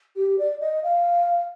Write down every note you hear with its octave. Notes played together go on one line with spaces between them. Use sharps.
G4
D5
D#5
F5